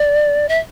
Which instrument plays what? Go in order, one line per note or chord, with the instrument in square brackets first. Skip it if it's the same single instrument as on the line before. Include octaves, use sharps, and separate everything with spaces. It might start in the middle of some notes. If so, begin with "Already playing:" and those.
Already playing: [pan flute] D5
E5